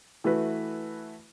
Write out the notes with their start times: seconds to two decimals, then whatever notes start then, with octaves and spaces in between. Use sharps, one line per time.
0.24 E3 A3 F#4 B4